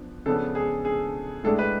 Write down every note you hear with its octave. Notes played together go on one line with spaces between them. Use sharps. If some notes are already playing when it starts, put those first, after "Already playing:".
Already playing: F3 B3 D4
C#3 F3 B3 D4 A4
G#4
G#4
A2 G#3 D4 A4
B4